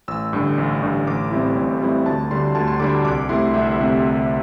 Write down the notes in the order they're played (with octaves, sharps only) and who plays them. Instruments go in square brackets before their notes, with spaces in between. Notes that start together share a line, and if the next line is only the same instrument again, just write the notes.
[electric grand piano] A1 E6
G2 D3
A1
G2 D3
A1 D6
A2 G3 C4 E4
A1
A2 G3 C4 E4
D2 A5
D3 G3 D4 C6
D2 A5
C6
D3 G3 D4 D6
C2 D6
C3 A3 E4 C6
C2 E5
C3 A3 E4